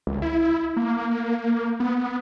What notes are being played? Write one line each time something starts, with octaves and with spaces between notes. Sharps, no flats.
C#2
E4
A#3
A#3
B3